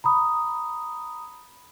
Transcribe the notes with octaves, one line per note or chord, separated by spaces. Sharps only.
A#5 B5 D#6